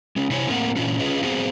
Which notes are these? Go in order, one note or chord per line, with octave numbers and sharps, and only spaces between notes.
G#3 C#4
C3 E4 C5 C#5 G#5
A2 A#3 C4 A#4 F5 F#5
A#2 E3 C#4 D4 F4 F#4
C#4 F4 G#4 B4 D#5 F5
B3 C4 F#4 G#4 C5 F5